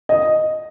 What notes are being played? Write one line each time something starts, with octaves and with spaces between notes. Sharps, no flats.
D#5